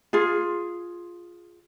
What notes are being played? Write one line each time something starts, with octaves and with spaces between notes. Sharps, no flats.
F4 G#4